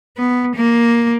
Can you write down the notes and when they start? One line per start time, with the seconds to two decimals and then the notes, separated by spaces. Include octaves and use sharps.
0.18 B3
0.56 A#3